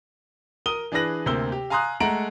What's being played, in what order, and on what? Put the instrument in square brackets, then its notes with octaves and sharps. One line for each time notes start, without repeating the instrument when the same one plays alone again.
[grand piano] A#4 D#6 D#7 G7
E3 D4 G#4 B4 A#6 F#7
D2 C3 A#3 C5 E6 G7
G4
F5 G#5 A#5 C6 D#6 F#6
G#3 A3 F#5 A#5 D7 F#7